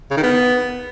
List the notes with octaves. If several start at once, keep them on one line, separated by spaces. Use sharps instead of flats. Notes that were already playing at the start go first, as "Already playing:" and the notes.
C#3
D#3
B3